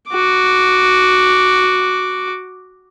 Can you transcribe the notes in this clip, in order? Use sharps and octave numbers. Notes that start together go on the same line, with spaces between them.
F#4 D6